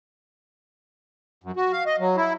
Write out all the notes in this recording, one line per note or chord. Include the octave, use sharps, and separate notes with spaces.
F#2
F#4
F5
D#5
F#3
E4